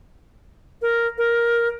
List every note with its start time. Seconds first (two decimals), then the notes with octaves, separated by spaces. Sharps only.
0.82 A#4
1.18 A#4